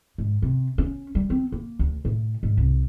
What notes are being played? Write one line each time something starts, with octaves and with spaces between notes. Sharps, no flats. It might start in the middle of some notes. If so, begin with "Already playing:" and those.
G#2
C3
C#4
G3
C4
A#3
D2
A2
G#2
C2